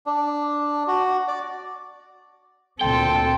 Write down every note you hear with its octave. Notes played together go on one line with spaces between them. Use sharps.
D4
F#4
D5
D2 A#2 C4 A4 G5 C6